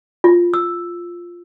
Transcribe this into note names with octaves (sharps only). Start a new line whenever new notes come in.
F4
E6